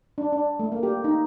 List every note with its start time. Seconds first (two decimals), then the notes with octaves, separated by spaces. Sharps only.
0.18 D4
0.32 D4
0.59 A3
0.72 A#3
0.83 G4
1.04 D#4